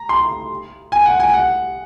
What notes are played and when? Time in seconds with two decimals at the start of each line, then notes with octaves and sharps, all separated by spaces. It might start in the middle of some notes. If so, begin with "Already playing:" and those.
Already playing: A#5
0.09 C6
0.92 G#5
1.06 F#5
1.20 G#5
1.34 F#5